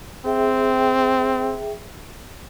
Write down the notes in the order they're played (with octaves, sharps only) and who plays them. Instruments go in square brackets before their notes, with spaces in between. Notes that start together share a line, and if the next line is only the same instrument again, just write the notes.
[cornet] C4 [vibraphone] G#4 E5 G5